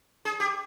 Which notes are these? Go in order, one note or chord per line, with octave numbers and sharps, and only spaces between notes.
G#4
G4